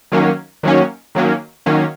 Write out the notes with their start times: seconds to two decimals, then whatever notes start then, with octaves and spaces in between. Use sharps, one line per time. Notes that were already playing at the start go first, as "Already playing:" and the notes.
0.12 D#3 F#3 A#3 C#4
0.63 D#3 F#3 A#3 C#4
1.15 D#3 F#3 A#3 C#4
1.66 D#3 F#3 A#3 C#4